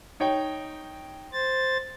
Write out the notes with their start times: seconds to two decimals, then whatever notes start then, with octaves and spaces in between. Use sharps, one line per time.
0.20 D#4 C#5 G5
1.33 C5 A6